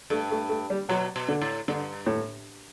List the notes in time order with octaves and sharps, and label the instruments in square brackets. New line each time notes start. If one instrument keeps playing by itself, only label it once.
[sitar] G2 [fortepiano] A3
[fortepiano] A3
A3
G3
[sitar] B2 [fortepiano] F#3
[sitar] B2
[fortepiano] D3
[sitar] A2
[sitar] G2 [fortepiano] D3
[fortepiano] A2